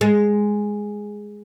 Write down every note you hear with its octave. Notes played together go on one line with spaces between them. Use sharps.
G#3